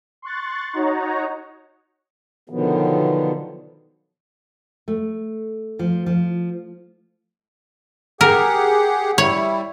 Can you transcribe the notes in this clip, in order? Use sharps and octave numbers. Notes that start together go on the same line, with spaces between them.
C6 C#6 F#6 A6
D#4 F#4 C#5 A#5
B2 D3 D#3 F3 F#3 B3
A3
F3
F3
G4 G#4 A#4 F#5
G3 E4 C#5